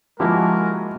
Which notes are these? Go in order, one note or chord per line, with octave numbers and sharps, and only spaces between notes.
F3 G#3 A#3 E4 F#4 G4 A#4 G#5